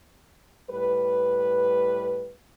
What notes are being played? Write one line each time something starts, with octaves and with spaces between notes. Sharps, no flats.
A2 G3 B4